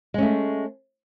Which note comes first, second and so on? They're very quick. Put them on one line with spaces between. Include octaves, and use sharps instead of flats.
G#3 C#4 A3